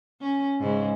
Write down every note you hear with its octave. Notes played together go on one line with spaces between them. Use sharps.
C#4
G#2 C#3